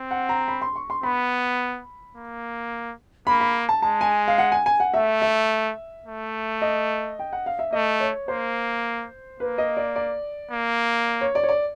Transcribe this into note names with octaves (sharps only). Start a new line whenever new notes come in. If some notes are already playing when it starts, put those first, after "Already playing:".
Already playing: C4
F#5
A#5
B5
C6
C#6
C6
B3 B5
A#3
A#3 B5
B5
A5
G#3 A5
G#5
F5
F#5
G#5
G#5
F#5
A3 E5
E5
A3
D#5
G5
F#5
F5
E5
A3 D#5
C#5
A#3 C5
A#3 B4
D#5
D5
D5
A#3
C#5
D5
C#5
D5